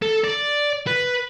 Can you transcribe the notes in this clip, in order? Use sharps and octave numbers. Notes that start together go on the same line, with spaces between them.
A4
D5
B4